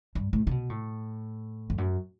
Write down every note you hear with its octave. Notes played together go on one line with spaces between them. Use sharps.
G2
A2
C3
B2
A2
F2
F#2